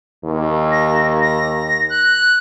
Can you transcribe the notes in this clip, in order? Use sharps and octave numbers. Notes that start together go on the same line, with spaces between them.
D#2
A#6
A#6
F#6